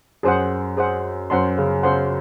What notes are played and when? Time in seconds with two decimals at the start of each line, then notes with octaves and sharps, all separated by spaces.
0.23 F#2 G#4 C5 F#5
0.77 G#4 C5 F#5
1.30 F#2 C5 F#5 C6
1.58 C#3
1.83 C#3 C5 F#5 C6